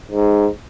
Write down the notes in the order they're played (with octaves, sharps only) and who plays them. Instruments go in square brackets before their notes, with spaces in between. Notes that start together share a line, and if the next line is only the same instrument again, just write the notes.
[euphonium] G#2